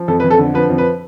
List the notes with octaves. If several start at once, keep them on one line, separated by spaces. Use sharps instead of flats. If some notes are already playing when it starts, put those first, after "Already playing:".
Already playing: F3
F2 A4
B4
F2
A4
D3
F3 B4
F2
B4